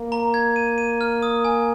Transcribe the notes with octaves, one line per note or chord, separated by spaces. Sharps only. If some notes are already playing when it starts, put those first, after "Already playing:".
Already playing: A#3
A#5
G#6
D#7
D#7
F6
D#6
G#5